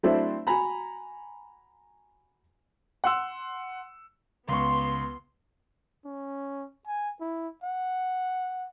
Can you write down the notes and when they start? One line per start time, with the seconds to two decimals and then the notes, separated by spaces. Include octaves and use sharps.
0.03 F#3 A3 C4 D4 E4
0.47 F#4 G#5 A#5 B5
3.04 F#5 C6 E6
4.49 C#2 B3 C6 C#6
6.05 C#4
6.87 G#5
7.21 E4
7.64 F#5